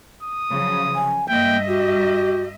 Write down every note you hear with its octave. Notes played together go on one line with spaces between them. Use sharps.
D#6
C#3 F3 F#3
G#5
G2 A#3 D#5 E5 G5
F#4 G4